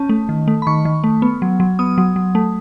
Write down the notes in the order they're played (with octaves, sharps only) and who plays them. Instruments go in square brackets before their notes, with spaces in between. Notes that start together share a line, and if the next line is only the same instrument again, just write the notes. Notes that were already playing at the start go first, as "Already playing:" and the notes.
Already playing: [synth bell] C#4 A5
A3
D#3
A3
B5
D#3 C#6
D#3
A3
B3
F#3
F#3
B3 D#6
F#3
F#3
A3